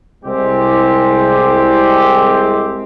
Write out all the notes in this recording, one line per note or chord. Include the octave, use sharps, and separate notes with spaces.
C2 G#3 C4 G4